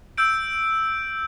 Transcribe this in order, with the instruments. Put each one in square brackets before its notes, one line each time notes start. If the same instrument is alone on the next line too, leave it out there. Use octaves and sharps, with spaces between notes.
[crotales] E6 G6 D7